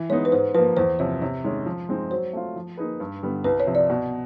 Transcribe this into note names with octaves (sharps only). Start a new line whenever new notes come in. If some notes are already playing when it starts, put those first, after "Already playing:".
Already playing: E3
G#3 B3 D#4 C#5
B4
G#2 C5
F3 A#3 B4
E2 C5
C3 F3 C#5
C3 C#5
D#3 G#3 C#4
F3
G#3 C4 D#4
F#3 C5
A3 C4 F4
F3
A#3 D#4 G#4 B4
G2
D3 G3 B3
C2 B4
C#5
C3 F3
D5
B2